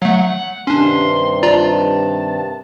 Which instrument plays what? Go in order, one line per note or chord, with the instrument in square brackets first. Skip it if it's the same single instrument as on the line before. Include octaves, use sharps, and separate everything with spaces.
[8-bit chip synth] F#3 A3 [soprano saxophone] F#5
[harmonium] G2 C3 D#3 [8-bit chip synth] C#4 D4 [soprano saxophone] C6
[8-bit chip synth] F4 D5 A#5 [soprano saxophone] A5